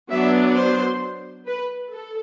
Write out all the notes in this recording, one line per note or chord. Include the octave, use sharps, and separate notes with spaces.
F#3 B3 D4 E5
C5
B4
A4